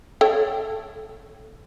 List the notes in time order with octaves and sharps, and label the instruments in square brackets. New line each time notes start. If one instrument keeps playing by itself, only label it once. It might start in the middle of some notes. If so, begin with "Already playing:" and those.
[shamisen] A4 C#5 G5